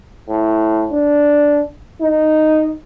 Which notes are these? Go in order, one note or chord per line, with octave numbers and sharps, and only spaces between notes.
A2
D4
D#4